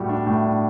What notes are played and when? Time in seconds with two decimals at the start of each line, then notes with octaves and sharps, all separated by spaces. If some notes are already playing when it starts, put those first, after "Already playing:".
Already playing: A2 G3 F#4
0.09 D4
0.27 A2
0.45 D4